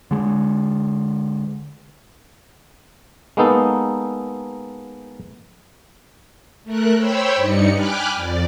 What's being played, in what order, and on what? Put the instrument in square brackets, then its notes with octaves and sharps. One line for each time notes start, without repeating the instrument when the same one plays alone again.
[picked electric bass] D3 G#3
[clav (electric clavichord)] G#3 A#3 B3 D#4 A4
[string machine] A3 A#4 F#6
C5 C#5 G5 B5 E6
G2 G3 D#4 C#7
G5 G#5 B5 D6 F6 F#6
F2 D5